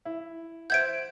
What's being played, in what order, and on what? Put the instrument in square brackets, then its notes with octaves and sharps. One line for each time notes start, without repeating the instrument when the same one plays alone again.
[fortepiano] E4
[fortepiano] C5 E5 F#5 [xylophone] G6 G#6 D7